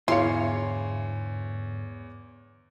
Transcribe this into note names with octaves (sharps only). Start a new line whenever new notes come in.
E2 G#2 D3 E4 C#5 F5 C6 C#7